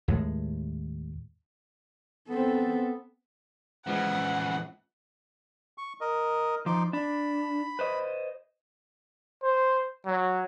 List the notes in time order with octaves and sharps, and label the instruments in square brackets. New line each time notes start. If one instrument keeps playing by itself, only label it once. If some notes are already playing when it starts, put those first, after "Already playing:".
[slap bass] D#2 A2 G#3
[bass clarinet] B3 [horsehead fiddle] C4 A4
[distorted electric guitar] C#3 E3 [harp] F3 G#3 F4 [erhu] F#5
[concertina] C#6
A#4 D#5
[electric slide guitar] F3 [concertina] D#4 C6 D6
[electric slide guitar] D4 [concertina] B5
[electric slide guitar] B4 C5 D#5
[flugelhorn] C5
F#3